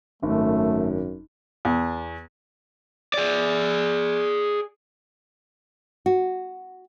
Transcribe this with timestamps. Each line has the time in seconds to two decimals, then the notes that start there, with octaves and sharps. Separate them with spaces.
0.23 G#1 F#2 A3
1.65 E2
3.14 G#4 D5
6.06 F#4